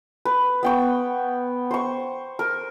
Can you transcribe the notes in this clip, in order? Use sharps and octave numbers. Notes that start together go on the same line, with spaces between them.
B4
B3 G5 C#6
C5 C#6
A#4